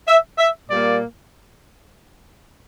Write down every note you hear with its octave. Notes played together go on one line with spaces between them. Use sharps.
E5
E5
A#2 G3 A#3 D5